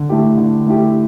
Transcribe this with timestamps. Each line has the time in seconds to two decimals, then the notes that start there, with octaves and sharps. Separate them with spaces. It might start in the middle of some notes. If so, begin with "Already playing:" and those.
Already playing: D3
0.09 A3 E4 G4
0.37 D3
0.66 A3 E4 G4